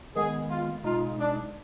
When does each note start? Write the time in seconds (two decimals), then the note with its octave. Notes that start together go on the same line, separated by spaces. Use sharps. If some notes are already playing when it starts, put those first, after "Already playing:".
0.15 D#3 G#3 B3 G#4
0.50 F4
0.84 B2 G#3 D#4 F4
1.19 D4